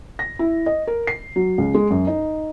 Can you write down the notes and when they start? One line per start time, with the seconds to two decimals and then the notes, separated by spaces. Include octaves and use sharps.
0.19 A#6
0.39 E4
0.66 D#5
0.87 A#4
1.07 C7
1.36 F#3
1.58 C#2
1.74 G#3
1.91 F#2
2.07 D#4